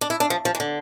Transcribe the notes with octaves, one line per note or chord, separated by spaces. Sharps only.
D4
E4
D4
F3
F3
E3
D3